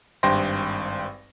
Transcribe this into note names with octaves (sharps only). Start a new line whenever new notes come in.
G#1 G2 C5 G5 C6 A#6